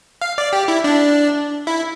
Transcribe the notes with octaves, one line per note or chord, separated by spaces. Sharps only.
F5
D5
G4
E4
D4
E4